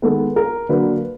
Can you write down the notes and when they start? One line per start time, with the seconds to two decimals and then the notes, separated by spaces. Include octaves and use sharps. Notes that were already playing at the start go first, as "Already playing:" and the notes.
0.02 D#3 G#3 B3 A4
0.36 A#4
0.69 D3 F#3 A#3 B4